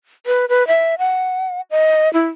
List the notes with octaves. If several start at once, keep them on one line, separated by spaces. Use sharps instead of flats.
B4
B4
E5
F#5
D#5
E4